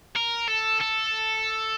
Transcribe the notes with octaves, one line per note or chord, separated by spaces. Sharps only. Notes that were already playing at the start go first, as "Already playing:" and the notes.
A#4
A4
A4